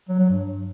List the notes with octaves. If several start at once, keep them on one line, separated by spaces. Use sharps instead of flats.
F#3
F#3
G2